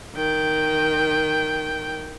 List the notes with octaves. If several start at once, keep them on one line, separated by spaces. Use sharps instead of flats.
D#3 G5